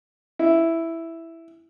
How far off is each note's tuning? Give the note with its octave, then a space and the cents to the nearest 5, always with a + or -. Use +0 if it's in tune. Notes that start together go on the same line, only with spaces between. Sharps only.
E4 +0